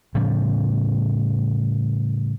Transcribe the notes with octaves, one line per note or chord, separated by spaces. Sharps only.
A2 C#3 F3 G3